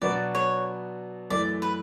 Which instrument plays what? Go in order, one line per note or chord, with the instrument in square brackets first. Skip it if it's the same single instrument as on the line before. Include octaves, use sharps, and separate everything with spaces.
[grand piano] B2 F#3 B3 D4 F#4 [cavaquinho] D5
[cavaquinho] C#5
[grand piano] F#2 E3 A3 [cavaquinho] D5
[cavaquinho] B4